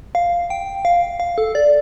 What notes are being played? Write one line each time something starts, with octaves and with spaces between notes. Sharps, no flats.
F5
G5
F5
F5
A4
D5